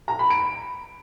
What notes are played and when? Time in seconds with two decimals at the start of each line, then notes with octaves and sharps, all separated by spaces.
0.08 A#5
0.19 B5
0.30 D7